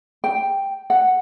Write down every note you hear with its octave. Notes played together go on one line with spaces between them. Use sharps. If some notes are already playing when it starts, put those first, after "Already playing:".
G5
F#5